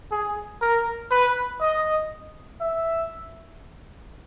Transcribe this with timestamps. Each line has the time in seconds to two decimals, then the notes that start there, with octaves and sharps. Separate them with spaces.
0.11 G#4
0.61 A#4
1.11 B4
1.61 D#5
2.61 E5